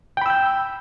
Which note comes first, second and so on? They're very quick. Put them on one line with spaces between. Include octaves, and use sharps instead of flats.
G5 B5 E6 G6